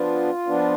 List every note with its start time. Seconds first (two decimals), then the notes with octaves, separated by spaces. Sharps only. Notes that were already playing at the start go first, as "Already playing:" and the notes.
Already playing: F3 B3 D4 F4
0.46 F3 B3 D4